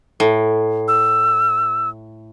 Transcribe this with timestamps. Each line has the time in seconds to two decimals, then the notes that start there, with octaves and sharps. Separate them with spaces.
0.20 A2
0.88 E6